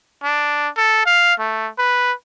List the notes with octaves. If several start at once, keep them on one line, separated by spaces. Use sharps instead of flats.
D4
A4
F5
A3
B4